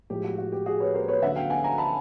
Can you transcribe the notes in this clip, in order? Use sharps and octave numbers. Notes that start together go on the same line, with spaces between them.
A2 F3 G#3 G4
F#4
F#4
G4
F#4 G#4
B4 C#5
A#4 C5
B4 C#5
D2 D3 F#3 E5 F#5
F5 G5
F#5 G#5
G#5 A#5
A5 B5